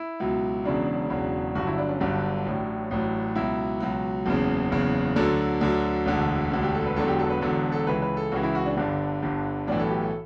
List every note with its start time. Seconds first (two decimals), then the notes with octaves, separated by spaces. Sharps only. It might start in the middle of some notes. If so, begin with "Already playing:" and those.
Already playing: E4
0.20 C#2 B2 F#3
0.64 E1 E2 C#3 F#3 D4
1.10 E1 E2 C#3 F#3
1.55 G1 G2 D3 F#3 F#4
1.67 E4
1.78 D4
1.89 C#4
2.00 G1 G2 D3 F#3 D4
2.46 A1 A2 F#3
2.91 A1 A2 F#3
3.35 C#2 B2 F#3 E4
3.80 C#2 B2 F#3
4.26 F#1 E2 C#3
4.71 F#1 E2 C#3
5.16 D2 D3 F#3 A4
5.61 D2 D3 F#3
6.06 E1 D2 D3
6.51 E1 D2 D3
6.63 G4
6.74 A4
6.86 B4
6.96 E1 E2 D3 F#3 A4
7.08 G4
7.19 A4
7.30 B4
7.42 E1 E2 D3 F#3 A4
7.72 A4
7.87 C#2 C#3 E3 B4
8.02 B4
8.17 A4
8.32 C#2 C#3 E3 F#4
8.43 E4
8.55 F#4
8.66 D4
8.77 G1 G2 D3 D4
9.22 G1 G2 D3
9.67 B1 A2 E3 D4
9.79 A4
9.90 G4
10.01 A4